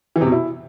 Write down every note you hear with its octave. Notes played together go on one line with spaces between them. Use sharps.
E3
C3
B2
E4